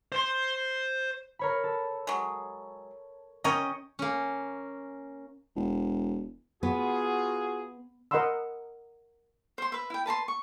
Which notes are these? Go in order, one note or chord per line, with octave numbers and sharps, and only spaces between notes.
C5 C6
A#4 C#5 B5
A4
F#3 G#3
C#4 A#4 C#5 D#5 G5 C#6
A#3 C#4
E1
B3 F4 F#4 G#4
A#4 D#5 F#5 B5 C6 E6
C5 C6
B4 E5
E4 G5
B4 A5 A#5 C6
C#6